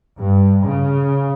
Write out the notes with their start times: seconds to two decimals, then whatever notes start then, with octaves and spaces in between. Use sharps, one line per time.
0.18 G2
0.65 C#3